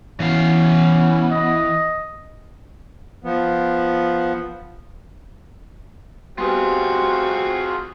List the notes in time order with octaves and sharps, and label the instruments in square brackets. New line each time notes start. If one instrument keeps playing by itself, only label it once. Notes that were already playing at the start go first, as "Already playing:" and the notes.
[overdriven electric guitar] E3 F5 [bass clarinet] B3 [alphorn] C#4
[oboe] D#5
[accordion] F3 B3
[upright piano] G3 B3 [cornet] C4 [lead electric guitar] F4 G#4 [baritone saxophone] F#4